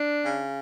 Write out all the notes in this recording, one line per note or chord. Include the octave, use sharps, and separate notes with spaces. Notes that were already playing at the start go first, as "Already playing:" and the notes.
Already playing: D4
C#3